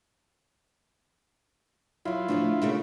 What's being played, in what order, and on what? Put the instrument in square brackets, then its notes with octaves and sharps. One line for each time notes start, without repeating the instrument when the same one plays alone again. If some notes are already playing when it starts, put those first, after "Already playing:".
[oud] F#2 F#3 [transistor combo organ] E4 F4
[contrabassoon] D2 [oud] A2 F3 A3
[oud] C#3 A3 A#3